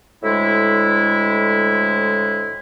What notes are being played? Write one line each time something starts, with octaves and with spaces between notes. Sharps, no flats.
D2 A2 G#3 E4